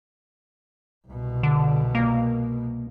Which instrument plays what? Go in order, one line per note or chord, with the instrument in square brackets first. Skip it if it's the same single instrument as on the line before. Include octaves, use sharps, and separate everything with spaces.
[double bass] C2 B2
[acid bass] D3
A#3